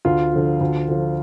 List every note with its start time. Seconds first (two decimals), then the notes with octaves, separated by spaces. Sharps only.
0.05 D2 F4
0.33 D3 F3
0.61 D2
0.88 D3 F3